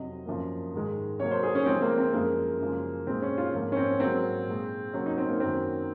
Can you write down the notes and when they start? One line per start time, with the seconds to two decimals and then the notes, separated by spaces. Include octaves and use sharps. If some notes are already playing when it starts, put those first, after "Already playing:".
Already playing: F2 C3 F#3 D#5
0.26 F#2 F3 A#3
0.73 G#2 D#3 G#3
1.20 C3 F#3 A#3 C#5
1.31 C5
1.43 G#4
1.55 C#4
1.66 C3 F3 G#3 C4
1.82 A#3
1.97 C4
2.14 F#2 F3 G#3 A#3
2.61 F#2 C#3 F3 G#3
3.07 A#2 G#3 C4
3.22 C#4
3.37 F4
3.54 G#2 F3 A#3
3.72 C#4
3.76 C4
4.00 G#2 F#3 A#3 C4
4.47 A#2 G#3
4.93 C3 F#3 A#3 C#4
5.06 D#4
5.18 C4
5.29 A#3
5.40 F#2 D#3 F#3 A#3 C4